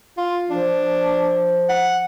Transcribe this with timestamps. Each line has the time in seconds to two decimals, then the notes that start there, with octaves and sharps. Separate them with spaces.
0.17 F4
0.50 F3 D4
1.69 F#5